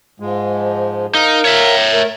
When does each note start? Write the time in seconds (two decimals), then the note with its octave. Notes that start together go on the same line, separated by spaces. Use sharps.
0.20 G#2 F3 G#3
1.15 D#4 A#4 F5 A#5
1.45 C#5 E5
1.94 A3 A#4